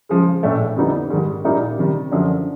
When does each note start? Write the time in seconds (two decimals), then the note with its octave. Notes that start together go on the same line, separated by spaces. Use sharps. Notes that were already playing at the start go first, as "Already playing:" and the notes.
0.09 C#3 F3 G#3
0.43 A#1 A2 E3 A3 D4
0.76 F2 D3 G3 B3 D#4
1.10 G#2 D#3 G3
1.44 A#1 A#2 G3 A#3 D#4
1.78 C3 D#3 G3
2.11 F#2 D3 F3